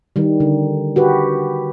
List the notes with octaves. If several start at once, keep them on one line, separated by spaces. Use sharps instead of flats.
D#3 G3
D3
F#4 G4 B4